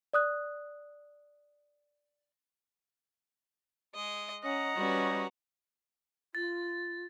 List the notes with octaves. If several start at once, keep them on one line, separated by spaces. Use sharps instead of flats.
D5 D#6 F#6
G#3 D#5
C#4 D#5 F#5 A#5
G3 C#4 F#4 B4
F4 A6